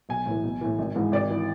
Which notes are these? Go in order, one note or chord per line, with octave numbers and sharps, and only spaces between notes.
B1 G#5
A2 E3
B1
A2 E3
G#1
G#2 E3
G#1 D5
E3